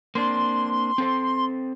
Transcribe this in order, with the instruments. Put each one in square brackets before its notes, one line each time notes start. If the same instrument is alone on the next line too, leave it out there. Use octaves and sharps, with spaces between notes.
[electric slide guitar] A#3 C4 D4 [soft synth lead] C6
[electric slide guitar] C4 A4 C5